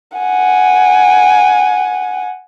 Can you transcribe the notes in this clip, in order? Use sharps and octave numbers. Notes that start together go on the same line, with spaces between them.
F#5 G#5